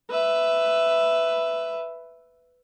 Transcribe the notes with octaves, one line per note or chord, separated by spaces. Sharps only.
B4 E5